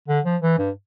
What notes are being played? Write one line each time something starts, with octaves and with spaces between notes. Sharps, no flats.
D3
F3
E3
G2